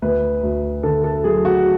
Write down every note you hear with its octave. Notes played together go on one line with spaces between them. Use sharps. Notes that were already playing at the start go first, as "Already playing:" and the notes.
D2 B4
D2
D3 A4
A4
F#3 G#4
F#4